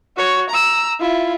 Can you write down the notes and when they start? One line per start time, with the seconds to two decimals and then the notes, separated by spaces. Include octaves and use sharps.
0.17 F#4 C#5
0.49 A#5 E6
1.00 E4 F4